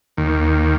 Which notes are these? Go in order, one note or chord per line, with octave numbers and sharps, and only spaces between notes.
D#2